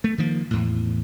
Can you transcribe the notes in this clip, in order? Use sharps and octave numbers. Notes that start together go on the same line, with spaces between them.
A3
D#3 F3 A#3
E2 A2